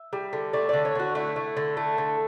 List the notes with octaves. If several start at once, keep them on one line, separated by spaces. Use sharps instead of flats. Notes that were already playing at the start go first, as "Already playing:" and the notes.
Already playing: E5
G3
D3
A3 D5
D3 D5
C#5
D3 F#4
A3 E4
A3
D3
A3
D3